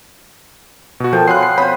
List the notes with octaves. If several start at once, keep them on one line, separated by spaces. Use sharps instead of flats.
B2 F#4
F3 A4 A#4 G5 A5
B3 F4 C#5 G#5 C6 F#6 C7
C7
B3 C5 C#5 B5